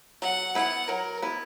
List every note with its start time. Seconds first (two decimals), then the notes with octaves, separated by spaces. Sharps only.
0.22 F#3 F#5
0.55 B3 E4 F#5
0.88 F#3 A#4
1.22 B3 E4